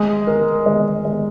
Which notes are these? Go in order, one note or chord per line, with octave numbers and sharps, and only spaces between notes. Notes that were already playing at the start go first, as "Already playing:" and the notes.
Already playing: G#3
A#4
G#3
G#3